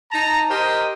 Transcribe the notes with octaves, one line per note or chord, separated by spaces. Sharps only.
D#4 A5 A#5
G4 A#4 C5 D#5